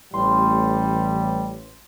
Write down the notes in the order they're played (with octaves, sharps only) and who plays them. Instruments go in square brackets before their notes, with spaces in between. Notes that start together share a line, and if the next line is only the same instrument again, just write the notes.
[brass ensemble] A1 [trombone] G3 [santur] C6